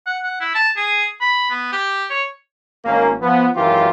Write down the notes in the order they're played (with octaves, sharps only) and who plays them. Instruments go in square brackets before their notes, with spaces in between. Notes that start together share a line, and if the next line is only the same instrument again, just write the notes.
[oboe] F#5
F#5
E4
A5
G#4
B5
B3
G4
C#5
[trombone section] G#1 A#3 C#4
F3 B3
G#1 F#2 E3 F4 G4 A#4